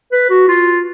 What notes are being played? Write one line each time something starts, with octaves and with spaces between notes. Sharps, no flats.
B4
F#4
F4